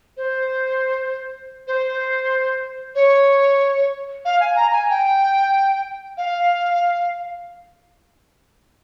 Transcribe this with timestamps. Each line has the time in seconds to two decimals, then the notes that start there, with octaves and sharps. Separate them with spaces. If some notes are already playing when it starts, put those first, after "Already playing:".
0.17 C5
1.67 C5
2.95 C#5
4.25 F5
4.40 G#5
4.56 A#5
4.73 G#5
4.90 G5
6.17 F5